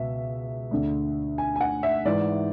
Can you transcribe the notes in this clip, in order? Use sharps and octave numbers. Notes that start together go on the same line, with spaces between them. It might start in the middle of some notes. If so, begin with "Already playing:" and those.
Already playing: C#2 B2 E5
D2 D3
G#5
G#5
F#5
E5
G#2 E3 D5